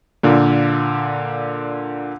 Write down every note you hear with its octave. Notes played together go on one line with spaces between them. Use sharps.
A#2 D3 A#3